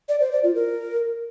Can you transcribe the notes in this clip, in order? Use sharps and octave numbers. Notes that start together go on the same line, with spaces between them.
D5
C5
D5
F4
A#4